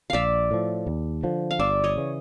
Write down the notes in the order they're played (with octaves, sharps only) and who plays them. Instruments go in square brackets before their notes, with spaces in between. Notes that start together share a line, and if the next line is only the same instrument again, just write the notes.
[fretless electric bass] A#1 [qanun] D5 E5 F5
[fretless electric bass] A2 F3
D#2
D3 F3
[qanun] F5
[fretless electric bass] G1 [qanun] D5 E5
[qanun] C#5 D#5
[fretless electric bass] C#3 E3